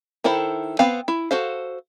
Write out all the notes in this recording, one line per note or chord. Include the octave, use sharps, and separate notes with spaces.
D#3 E4 A4 C5 B5
B3 C4 F5 B5
E4
F#4 A4 C5 F5